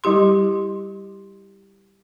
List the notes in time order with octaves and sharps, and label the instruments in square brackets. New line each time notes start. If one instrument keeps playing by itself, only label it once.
[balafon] G3 E4 G4 C6